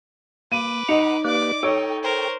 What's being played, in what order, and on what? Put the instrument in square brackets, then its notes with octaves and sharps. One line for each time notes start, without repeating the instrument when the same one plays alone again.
[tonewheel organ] A#3 [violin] B4 D6 [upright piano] D#7
[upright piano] D#4 [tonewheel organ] F#5 A#5
[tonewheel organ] A#3 G4 B4 [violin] D5 D6
[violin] D#4 [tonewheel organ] A4 G5 [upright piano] C#5
[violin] A#4 C5